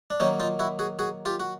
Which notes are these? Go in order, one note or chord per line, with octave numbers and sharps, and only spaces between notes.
D4
D#3 F#3 A#3 C#4 D#4
D#4 F4
E4 F#4
F#4 G#4
F#4 G#4
F4 G4
F#4